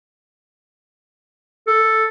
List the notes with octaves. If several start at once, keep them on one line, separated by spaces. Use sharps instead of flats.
A4